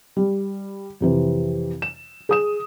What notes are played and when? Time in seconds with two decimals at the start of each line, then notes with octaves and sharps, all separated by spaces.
0.17 G3
1.01 F2 C3 E3
1.82 E7
2.29 G#4 D#6 E7